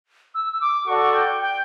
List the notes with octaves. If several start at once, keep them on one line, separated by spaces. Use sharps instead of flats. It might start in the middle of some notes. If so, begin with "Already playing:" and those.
E6
E6
D6
F#4 A4 D5 F#5 C#6
G5
G5